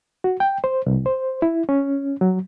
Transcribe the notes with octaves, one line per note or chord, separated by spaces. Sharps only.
F#4
G5
C5
C2
C5
E4
C#4
F#3